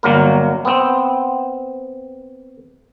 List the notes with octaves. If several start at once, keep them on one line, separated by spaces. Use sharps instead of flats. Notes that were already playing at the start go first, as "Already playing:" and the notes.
G1 F#3 A#3 A#4
B3 C4